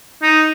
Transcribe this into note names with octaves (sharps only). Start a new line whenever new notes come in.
D#4